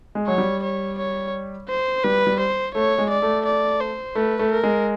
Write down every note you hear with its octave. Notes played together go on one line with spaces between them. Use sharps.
G#3
F#3 C#5
G3
C#5
C#5
C5
G3 B4
G3
C5
A3 C#5
G#3
D5
A3
D5
C5
A3 B4
A3
A#4
G#3